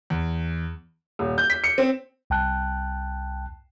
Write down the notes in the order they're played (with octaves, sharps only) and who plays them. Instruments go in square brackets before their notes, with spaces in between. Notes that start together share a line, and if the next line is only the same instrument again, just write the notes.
[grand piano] E2
[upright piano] D#1
G6
B6
C#7
C4
[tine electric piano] C2 G5 A5 F#6